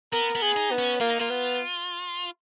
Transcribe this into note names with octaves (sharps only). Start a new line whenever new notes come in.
B3 A#4
B3
G#4
D#4
B3
C#4
A#3 F4
D#4
A#3 F4
B3